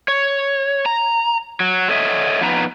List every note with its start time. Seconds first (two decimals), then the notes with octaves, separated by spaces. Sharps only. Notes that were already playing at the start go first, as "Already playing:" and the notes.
0.08 C#5
0.86 A#5
1.60 F#3
1.89 A4 C#5 D#5 E5
2.41 F3 B3 D#4 B4 A#5